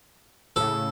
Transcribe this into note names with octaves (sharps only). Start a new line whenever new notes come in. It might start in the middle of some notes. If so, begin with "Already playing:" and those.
A2 C#3 A4